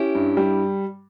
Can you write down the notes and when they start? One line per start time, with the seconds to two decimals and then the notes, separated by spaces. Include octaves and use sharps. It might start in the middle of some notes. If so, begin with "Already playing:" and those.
Already playing: C#4 E4 G4
0.15 G2
0.37 G3